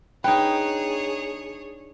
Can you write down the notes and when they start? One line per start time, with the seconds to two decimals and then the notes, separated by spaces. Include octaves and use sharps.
0.24 D4 D#4 G#4 B4 C#5 G5